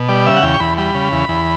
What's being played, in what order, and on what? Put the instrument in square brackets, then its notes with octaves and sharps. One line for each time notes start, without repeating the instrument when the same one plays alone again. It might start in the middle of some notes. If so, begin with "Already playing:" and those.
Already playing: [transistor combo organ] B2
G3 D5
C#3 E5
F#5
E2 G5
C#6
E2 B5
G3 B5
C#3
E2
E2